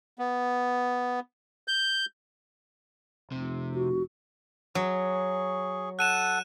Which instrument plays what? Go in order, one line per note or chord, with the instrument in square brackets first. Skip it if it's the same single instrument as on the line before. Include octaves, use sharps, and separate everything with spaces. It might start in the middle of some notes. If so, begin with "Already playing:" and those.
[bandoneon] B3
G6
[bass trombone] F1 [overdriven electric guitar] C3
[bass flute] F#4
[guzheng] F#3 [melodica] G#4 C#6
[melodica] A4 F#5 [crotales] F#6 D#7 E7